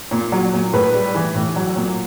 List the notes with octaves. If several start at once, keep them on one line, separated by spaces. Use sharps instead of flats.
A#2
F#3
A#2
A2 B4
G3
E3
A2
F#3
A#2